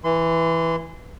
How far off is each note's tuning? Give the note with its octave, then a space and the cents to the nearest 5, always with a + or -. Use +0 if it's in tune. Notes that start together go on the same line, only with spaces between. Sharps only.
E3 +0 C6 -30